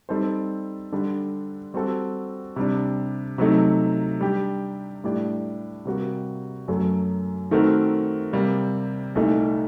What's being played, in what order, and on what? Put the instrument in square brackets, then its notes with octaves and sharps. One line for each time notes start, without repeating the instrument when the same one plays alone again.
[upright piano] G3 C4 D#4 A4 C5
D3 G3 D4 A4
G3 C4 F#4 A4
C3 G3 D4
C3 F#3 A3 D#4
G3 D4 G4
A2 G3 D4 G4 D5
C3 G3 A#3 F#4
F#2 F#3 A3
D#3 A3 C4 F#4 A#4
C3 G3 A#3
C2 A#2 A3 D#4